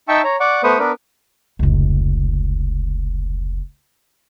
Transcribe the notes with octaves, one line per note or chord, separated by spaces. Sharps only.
D#4 E5 G5 A5 C#6 E6
C#5 A#5
D5 F#5 C#6 D6
A3 B3 B4 C5 C#6 D#6
B3 D4 A#4 B4
F1 C#2